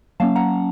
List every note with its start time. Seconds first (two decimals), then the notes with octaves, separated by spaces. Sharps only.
0.20 F#3 A#3 C#4 F5 A5
0.36 F#5 A#5